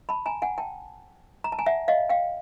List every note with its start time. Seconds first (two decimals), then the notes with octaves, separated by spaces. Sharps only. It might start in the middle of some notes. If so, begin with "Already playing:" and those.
0.09 A5 B5
0.26 G#5 A#5
0.42 F#5 G#5
0.58 G5 A5
1.44 A#5
1.52 A5
1.59 G#5 A#5
1.66 E5 F#5
1.88 D#5 F5
2.09 F5 G5